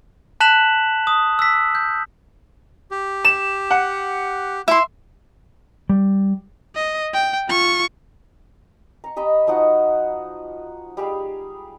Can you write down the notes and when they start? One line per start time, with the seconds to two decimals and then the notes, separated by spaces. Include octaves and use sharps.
0.40 A5 F#6 B6 E7 F#7
1.07 D#6
1.39 E6 B6
1.75 G6
2.91 G4
3.25 E7
3.71 F#5
4.68 E4 E5 C6
5.89 G3
6.75 D#5
7.13 G5
7.49 F4 C#6
9.04 A#5 C#6
9.16 G4 D#5 A#5 B5
9.47 F3 D#4 F#4 F#5
10.97 G3 G4 G#4 F5